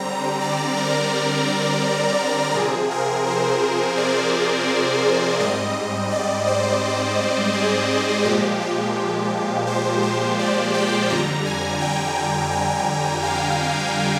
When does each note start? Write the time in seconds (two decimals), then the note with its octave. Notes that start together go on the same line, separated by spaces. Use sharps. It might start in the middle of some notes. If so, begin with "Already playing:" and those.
Already playing: D3 G3 C4 A#5
0.41 D5
0.77 A#4
2.54 C3 F3 C4 G#4
2.90 A#4
3.26 C5
3.97 D5
5.40 G#2 G3 C4 D#5
6.11 D5
6.47 C5
7.53 G#4
8.25 A#2 F3 G#3 G4
8.60 G4
9.67 C5
10.03 C5
10.39 D5
10.74 G5
11.10 F2 D3 G3 A#5
11.46 G#5
11.81 G5
12.52 G5
13.23 F5